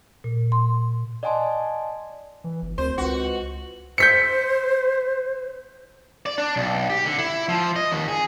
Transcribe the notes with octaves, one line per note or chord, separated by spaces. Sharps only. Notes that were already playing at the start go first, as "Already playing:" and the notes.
A#2
C6
D5 D#5 F#5 G#5 A5 C6
E3
G1
D2 C4 A#4 C5
C#2 F4 F#4 B4 C5
B4 D#5
C5 G6 B6 C#7
D5
D4
B1
G4
D3
E4
F3
D#5
D#2
G#4